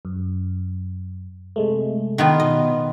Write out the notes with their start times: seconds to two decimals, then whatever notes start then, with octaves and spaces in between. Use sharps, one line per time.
0.05 F#2
1.56 C3 G#3 A3
2.18 D#3 B3 F4
2.40 B2 D#5